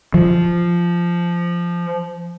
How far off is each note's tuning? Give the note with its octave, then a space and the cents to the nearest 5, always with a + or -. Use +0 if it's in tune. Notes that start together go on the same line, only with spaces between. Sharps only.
F3 -10